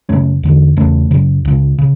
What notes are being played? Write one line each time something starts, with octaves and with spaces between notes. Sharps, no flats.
F#2 C#3 A3 C#4
E2 D3
E2 C#3 A3 C#4
F#2 C#3
C#2 C#3
C#3